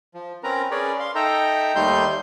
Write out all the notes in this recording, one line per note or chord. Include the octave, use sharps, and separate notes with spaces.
F3
C4 C#4 A#4 B4 A#5
C#4 G#4 A#4 B4 C#5 D5
F5 C6
D#4 A4 E5 G5 A#5
D#2 G3 A3 D#4 C6 G6